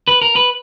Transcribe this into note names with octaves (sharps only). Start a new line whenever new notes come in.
B4
A#4
B4